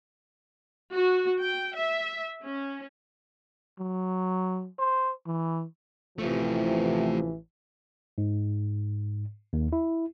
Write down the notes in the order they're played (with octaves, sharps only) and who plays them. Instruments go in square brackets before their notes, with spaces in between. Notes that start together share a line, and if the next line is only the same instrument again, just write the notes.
[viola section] F#4
G5
E5
C#4
[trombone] F#3
C5
E3
[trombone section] A1 E3 [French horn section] C3 F3 [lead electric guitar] A3 F4
[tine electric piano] G#2
D#2
E4